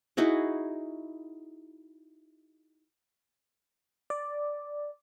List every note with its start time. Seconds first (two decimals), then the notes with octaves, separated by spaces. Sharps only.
0.17 D#4 E4 F#4 G#4
4.10 D5